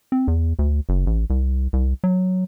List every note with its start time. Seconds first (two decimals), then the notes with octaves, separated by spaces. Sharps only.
0.12 C4
0.28 E2
0.59 D2
0.89 F#1
1.06 A1
1.30 C2
1.73 C2
2.04 F#3